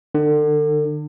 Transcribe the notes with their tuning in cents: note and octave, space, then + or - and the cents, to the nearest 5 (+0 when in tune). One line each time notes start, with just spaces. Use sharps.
D3 +35